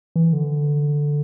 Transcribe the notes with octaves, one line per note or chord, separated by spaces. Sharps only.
E3
D3